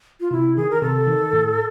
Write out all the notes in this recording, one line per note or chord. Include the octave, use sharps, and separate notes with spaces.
F4
C3 E4
D#3 G#4
A#4
C3 A4
D#3
A2